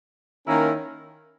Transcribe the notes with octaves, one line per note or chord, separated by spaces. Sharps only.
D#3 A#3 C#4 E4 A#4